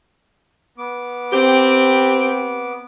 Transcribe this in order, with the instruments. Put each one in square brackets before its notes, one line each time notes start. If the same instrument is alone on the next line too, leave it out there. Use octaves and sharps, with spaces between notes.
[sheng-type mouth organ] B3 D6
[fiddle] C4 [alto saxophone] G4